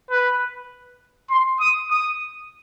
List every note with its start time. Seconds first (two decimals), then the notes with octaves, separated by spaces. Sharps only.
0.11 B4
1.30 C6
1.60 D#6
1.91 D#6